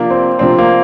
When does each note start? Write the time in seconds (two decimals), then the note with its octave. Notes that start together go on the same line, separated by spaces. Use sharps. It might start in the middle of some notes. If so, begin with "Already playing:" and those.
Already playing: C3 F3 A#3 D4
0.10 C4
0.39 C3 F3 C4 D4
0.58 A#3